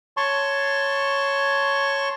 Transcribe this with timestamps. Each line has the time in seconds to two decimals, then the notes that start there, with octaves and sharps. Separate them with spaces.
0.17 C#5 A5 C6 C#6